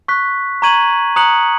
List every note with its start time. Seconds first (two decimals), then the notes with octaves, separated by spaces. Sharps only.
0.08 C#6 F#6 B6
0.62 A#5 C#6 G#6 D#7 F#7
1.16 A#5 D#6 F#6 C#7 F#7